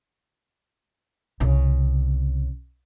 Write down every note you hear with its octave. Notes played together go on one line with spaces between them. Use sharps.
C2 C#3